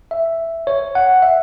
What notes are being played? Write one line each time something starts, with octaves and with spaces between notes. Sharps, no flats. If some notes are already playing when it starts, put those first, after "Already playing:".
E5
C#5
F#5
E5